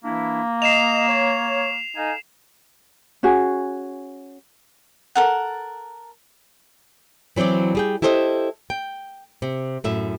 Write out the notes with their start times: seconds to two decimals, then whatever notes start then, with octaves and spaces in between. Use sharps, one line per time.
0.04 E3 A#3 D4 E4
0.62 D#5 C7 E7 F7
1.09 C#5
1.96 D#4 A4 F5 G#5
3.23 C#4 F#4 G#4
5.15 A4 A#4 F#5
7.36 E3 F#3 C4 E4 D5
7.75 G3 G#4 G5
8.02 E4 G4 A4 C5 D5 D#5
8.70 G5
9.42 C3
9.84 F#2 A2 E5